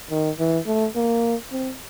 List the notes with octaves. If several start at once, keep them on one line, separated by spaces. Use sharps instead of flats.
D#3
E3
A3
A#3
C4